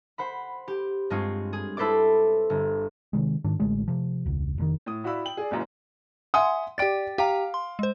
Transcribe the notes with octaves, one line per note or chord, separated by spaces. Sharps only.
C5 F#5 B5
G4
G2 G#3 C4 F4 C#5
G#4
E4 A4 B4 C5 D5 D6
G1
C3 D#3 G#3
G#2 D#3 D4
A1 D3 G#3 A3
C3 F3
E1 C#2
F1 A2 D#3
A2 D#6
E4 F#4 D5 F5 B5 E6
G5 F#7
G#4 D5
F#1 F#2 E3
E5 F#5 G#5 C6 D#6
G4 D5 G5 A6 D7
G4 F5 G5 A#5
C6
G#3 C5